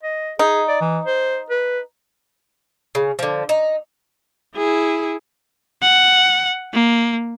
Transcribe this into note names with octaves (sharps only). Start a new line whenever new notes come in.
D#5
D#4 G#4
D5
E3
C5
B4
C#3
D3 F3
D#4
E4 G#4
F#5
A#3